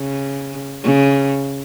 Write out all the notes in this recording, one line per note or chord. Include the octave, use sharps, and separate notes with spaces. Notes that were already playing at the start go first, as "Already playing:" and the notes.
Already playing: C#3
C#3